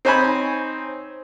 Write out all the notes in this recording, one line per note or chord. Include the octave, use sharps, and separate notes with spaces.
C4 D#4 C5 C#5 G#5 B5